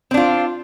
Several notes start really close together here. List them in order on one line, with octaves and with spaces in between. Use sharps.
C4 D4 F4